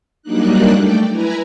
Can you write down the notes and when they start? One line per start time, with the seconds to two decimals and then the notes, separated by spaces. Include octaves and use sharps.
0.22 F#3 G3 A#3 D4 D#4 F#6
0.70 A3 D5 G5
1.10 E4 B4 G#5 A#5